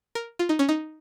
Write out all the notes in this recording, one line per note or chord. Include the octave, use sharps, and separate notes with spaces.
A#4
F4
D#4
C#4
D#4